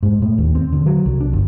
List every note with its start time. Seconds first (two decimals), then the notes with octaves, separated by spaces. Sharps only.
0.03 G#2
0.22 A2
0.38 D#2
0.55 C4
0.72 D3
0.86 F#3
1.06 C2
1.20 D4
1.33 G1